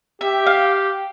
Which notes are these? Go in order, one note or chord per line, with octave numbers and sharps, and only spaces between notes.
G4 E5
F5